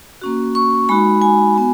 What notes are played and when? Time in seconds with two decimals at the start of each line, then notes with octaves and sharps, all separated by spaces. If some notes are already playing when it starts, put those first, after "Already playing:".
0.22 A#3 C#4 F#4
0.55 C#6
0.89 G#3 D#4 F#4 B5
1.22 G#5
1.55 B3 F#4